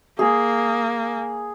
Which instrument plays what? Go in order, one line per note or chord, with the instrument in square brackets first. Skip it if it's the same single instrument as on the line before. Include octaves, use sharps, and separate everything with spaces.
[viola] A#3 [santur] G#4